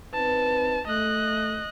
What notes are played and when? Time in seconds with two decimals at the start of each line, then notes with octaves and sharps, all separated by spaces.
0.14 C4 D#4 B4 A5
0.87 A3 D#5 F#6